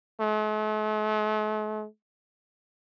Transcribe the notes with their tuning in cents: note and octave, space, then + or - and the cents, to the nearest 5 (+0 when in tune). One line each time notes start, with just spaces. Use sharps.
A3 -45